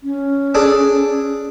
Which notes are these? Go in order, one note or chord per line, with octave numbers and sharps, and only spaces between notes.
C#4
D4 G#4 A4